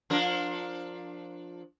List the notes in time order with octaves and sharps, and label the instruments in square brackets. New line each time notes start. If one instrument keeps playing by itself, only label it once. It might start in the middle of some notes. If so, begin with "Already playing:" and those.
[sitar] F3 D4 A#4